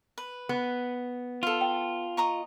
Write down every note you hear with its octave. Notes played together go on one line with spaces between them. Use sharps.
B4
B3
F4 A4 F5
G5
D#5 A#5 C#6